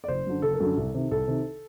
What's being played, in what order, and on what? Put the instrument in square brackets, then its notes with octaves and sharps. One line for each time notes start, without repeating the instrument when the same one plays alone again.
[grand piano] D5
F#1 C5
F#2 D3
F#1 A4
A#4
F#2 D3 A4
C2
C3 D#3
C2 A4
C3 D#3